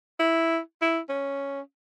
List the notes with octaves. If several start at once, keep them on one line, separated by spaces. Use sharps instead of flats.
E4
E4
C#4